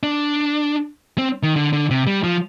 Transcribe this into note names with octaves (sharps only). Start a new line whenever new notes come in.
D4
C4
D#3
D3
D3
C3
G3
F3